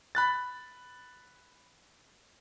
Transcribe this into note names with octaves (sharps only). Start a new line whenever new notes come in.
B5 F#6 A6